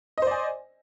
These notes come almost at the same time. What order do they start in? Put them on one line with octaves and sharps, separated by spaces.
D#5 C5 D5 G#5